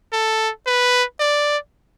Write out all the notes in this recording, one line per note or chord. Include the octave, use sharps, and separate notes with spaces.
A4
B4
D5